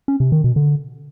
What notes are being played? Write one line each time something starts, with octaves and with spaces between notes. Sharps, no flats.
C#4
C3
D#3
B2
D3